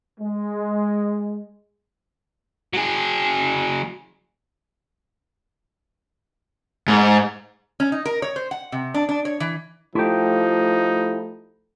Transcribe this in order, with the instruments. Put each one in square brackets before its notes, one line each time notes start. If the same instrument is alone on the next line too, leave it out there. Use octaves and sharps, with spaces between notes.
[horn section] G#3
[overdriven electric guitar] F#3 G#4
[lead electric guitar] G#2
[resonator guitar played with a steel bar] C#4
D#4
A#4
C#5
C5
F#5
C3
D4
D4
C#5
E3
[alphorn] F3 [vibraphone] A3 A4 [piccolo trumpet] D#4 [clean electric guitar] E4 G4 G5